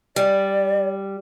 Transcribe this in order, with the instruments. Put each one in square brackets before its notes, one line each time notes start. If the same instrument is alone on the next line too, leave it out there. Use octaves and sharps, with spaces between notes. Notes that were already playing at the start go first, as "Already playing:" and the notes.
[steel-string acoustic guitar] G3 [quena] D5